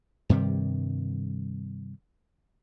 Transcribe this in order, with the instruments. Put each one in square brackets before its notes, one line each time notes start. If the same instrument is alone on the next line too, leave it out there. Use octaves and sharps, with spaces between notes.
[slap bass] G2 C3 D#3 G3